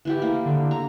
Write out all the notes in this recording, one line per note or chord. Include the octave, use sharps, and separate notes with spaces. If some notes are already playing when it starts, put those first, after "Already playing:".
E3 E4 G4
A#3
D3
A#5